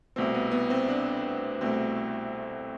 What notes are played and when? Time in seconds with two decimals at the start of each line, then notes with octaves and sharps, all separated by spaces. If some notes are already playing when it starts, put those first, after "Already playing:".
0.16 C2 B2 A3 C4
0.34 B3
0.51 B3
0.70 C4
0.88 D4
1.61 C2 B2 A3 C4